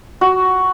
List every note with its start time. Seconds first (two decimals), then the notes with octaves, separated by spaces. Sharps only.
0.21 F#4